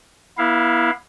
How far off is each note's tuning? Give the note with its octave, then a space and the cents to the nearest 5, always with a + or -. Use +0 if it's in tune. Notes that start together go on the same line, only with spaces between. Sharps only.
B3 -40 E4 +0 F5 +0